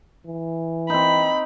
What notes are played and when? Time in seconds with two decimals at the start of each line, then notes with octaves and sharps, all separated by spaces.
0.27 E3
0.90 C4 D#4 B5